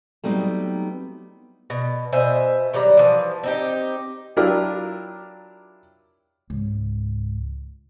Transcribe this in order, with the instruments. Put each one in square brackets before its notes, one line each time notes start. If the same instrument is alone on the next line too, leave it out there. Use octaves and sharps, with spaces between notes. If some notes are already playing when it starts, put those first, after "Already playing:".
[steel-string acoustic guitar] F#3 G3 A3 B3 C4 D#4
[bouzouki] B2
B2 C5 E5 G#5
D#3 F#3 G3 A#5
E3 F3
C4 D#4 G4
[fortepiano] F#3 D4 E4 F4 G4 A#4
[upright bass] C#2 G#2